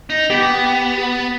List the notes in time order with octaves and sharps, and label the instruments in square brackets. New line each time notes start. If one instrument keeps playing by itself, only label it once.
[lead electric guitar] D#4
[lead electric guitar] B3 [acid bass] G4